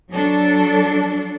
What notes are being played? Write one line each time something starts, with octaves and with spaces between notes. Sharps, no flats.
F#3 D4 A4